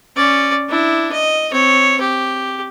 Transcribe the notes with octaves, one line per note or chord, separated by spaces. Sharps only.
C#4 D5
D4 E4
D#5
C4 C#5
G4